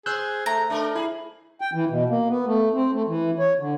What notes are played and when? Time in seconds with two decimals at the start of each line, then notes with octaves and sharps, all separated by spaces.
0.06 G#4 C5 E6 F#6 G6
0.46 A3 A#5
0.70 A3 D4 A#4 D#5
0.95 E4 G#4
1.61 G5
1.74 E3
1.90 B2
2.10 A#3
2.29 B3
2.46 A3
2.74 C4
2.93 A3
3.08 E3
3.39 C#5
3.60 D3